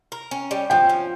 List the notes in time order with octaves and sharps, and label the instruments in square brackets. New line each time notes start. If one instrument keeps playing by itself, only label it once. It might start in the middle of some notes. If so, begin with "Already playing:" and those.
[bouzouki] A#4
C#4
G3
[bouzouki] F3 [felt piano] G5
[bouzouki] C#4